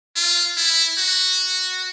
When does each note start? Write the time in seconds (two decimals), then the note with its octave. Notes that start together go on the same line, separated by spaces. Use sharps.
0.16 F4
0.57 E4
0.98 F#4